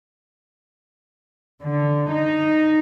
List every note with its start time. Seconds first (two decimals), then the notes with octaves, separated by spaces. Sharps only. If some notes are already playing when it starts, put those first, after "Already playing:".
1.62 D3
2.12 D#4